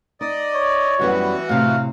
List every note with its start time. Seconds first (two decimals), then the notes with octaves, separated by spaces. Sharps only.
0.21 D#4 D5 D#5
0.54 C#5
0.99 F#2 E3 G3 B3 F#4
1.49 A2 C3 F5